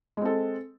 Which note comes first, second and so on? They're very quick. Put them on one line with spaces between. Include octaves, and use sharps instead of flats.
G#3 C4 A4